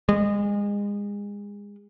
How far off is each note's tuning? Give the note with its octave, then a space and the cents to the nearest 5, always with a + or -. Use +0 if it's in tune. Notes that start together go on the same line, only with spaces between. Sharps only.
G#3 -30